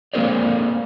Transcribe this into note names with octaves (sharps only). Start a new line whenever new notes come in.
G#3 A#3 C4 A#4 C5 D5